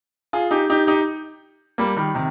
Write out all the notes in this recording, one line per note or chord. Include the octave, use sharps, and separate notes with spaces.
F4 G#4
D#4 G4
D#4 G4
D#4 G4
G3 A#3
D#3 G3
C3 D#3